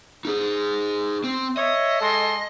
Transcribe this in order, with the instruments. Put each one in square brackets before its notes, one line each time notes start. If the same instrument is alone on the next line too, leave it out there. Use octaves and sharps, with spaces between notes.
[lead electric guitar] D#4 G#4
C4
[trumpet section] C#5 E5 [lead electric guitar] D#5
[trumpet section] G#3 A4 C6